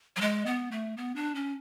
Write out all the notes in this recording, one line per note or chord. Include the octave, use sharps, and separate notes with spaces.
F#3
G#3
B3
A3
B3
D4
C#4